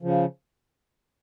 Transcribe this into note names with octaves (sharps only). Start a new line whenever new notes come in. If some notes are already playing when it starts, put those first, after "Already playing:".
C#3 F3